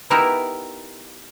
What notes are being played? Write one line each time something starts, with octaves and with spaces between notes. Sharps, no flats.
B3 D#4 E4 G4 A#4